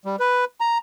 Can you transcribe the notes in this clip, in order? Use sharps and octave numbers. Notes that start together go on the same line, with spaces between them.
G3
B4
A#5